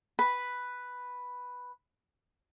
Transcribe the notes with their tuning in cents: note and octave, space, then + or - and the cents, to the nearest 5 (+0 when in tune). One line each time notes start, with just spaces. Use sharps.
B4 +0 B5 +0